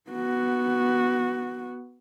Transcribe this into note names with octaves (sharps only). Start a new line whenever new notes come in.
B3 F#4